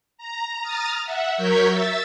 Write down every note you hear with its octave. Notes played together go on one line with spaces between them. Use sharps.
A#5
A#5 D#6 F6 A6
E5 F#5
F#3 A#4 C#6 G6 G#6 B6
E5 E6 A6